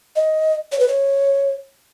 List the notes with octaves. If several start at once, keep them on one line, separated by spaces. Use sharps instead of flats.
D#5
C#5
B4
C#5